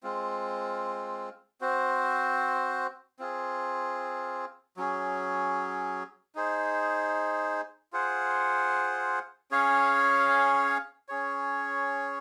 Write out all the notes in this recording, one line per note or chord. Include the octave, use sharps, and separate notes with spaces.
G#3 C4 F4
C4 F#4 C5
C4 F4 G#4
F#3 C#4 G#4
D#4 G#4 C5
F4 G#4 C5 F#5
C#4 G#4 C#5 F5
C#4 G#4 C#5